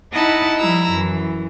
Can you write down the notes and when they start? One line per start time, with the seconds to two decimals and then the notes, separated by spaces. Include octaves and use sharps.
0.12 D#4 E4 D#5 F#5 A5 B5
0.57 F3 G3 E4 A#5 E6
0.90 F#2 E3